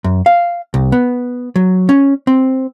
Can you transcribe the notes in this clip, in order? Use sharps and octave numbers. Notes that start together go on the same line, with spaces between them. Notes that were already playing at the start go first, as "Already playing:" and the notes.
F#2
F5
C2
B3
F#3
C#4
C4